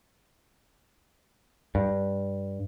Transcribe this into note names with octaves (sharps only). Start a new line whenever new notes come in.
G2